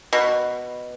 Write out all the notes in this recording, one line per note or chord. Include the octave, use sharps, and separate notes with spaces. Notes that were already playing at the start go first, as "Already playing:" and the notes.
B2